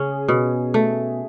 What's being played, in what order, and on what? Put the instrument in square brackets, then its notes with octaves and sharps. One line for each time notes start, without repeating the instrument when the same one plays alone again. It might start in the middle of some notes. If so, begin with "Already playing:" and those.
Already playing: [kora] C#3 C#4 [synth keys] G#4
[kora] B2
A3